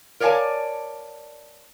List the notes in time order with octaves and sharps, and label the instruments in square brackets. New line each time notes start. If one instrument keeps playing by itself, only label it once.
[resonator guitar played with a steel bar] A#4 C#5 D5 F5 G#5 A5